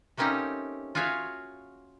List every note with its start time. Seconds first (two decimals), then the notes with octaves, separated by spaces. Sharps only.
0.17 A3 A#3 C4 C#4 D#4 G4
0.95 F4 F#4 G#4 C#5 E5 F5